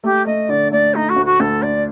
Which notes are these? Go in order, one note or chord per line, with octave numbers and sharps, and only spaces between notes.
A3 G4
A3 D#5
D3 D5
A3 D5
A3 D#4
F#4
D2
F#4
D2 A4
D4 D5